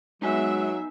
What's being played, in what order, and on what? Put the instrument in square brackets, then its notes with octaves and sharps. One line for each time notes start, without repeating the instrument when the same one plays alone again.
[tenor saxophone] F#3 [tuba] G#3 [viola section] B3 E5 [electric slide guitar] D#4 G#5